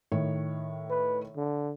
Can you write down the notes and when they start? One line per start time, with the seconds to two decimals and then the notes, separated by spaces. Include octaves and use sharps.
0.12 A2 D#3 C#5
0.90 B4
1.36 D3